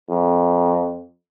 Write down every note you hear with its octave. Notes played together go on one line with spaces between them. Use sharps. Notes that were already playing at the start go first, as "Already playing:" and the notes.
F2